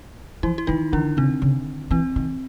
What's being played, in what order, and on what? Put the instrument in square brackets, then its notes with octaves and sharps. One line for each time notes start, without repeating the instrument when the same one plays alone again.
[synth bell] E3 E4 [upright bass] F3
[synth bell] E4
[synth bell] D#3 D#4 [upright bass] E3
[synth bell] D3 D4 [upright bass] E3
[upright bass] C#3 [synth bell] C4
[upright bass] C#3
[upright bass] E3 [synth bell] C4
[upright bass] D#3